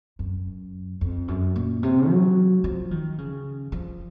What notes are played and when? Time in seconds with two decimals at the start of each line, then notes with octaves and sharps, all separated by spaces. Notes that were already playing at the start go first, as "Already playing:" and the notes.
0.19 F#2
1.01 F2
1.28 F#2
1.56 A#2
1.83 C3
2.10 F#3
2.64 F3
2.91 D#3
3.18 C#3
3.72 F3